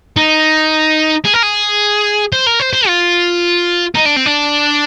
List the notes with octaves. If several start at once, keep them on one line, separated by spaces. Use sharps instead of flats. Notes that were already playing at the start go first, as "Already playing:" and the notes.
D#4
G#4
A#4
G#4
C5
A#4
C5
C5
F4
D#4
D4
C4
D4